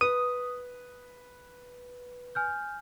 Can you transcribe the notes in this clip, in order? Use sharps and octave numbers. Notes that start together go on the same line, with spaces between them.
B4 D#6
G#5 F6 G6